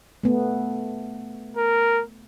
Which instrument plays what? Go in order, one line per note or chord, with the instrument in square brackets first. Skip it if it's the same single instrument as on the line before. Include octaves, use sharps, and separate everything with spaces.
[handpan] A3 B3
[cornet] A#4